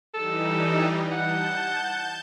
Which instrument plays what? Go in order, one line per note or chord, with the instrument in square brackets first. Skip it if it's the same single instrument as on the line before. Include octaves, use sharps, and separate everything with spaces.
[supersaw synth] E3 G3 D#4 [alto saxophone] A4
[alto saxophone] F#5 [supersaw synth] A5 G6